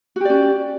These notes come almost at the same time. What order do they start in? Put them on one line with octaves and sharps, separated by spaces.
F#4 G4 D5 C#4